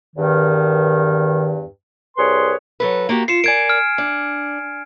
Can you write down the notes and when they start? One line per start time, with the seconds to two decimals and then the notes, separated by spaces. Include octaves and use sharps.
0.16 E2 G2 D#3
2.17 C2 G#4 B4 C#5 C6
2.80 F#3 A4 B4
3.09 A#3 F#4 G4
3.28 F4 C7 C#7 E7
3.44 A#4 D5 G#5 G#6 D7
3.70 F6
3.98 D4